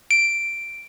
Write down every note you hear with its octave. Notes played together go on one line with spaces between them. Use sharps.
D7